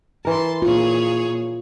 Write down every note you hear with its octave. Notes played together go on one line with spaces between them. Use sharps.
E3 A#4 A5 C6
A#2 F4 G#4 C#5